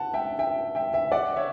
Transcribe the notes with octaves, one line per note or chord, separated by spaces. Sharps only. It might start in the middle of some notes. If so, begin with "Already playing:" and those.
Already playing: F#5 A5
E5 G5
E5 G5
E5 G5
E5 G5
D5 F#5
C#5 E5